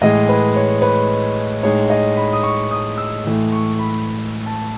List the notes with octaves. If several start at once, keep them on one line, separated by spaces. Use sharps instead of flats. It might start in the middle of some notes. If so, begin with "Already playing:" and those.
A2 E3 G#3 D#5
B4
C#5
B4
A2 G#3 D#4 C#5
D#5
B5
D#6
C#6
D#6
E6
A2 E3 A3
C#6
B5
A5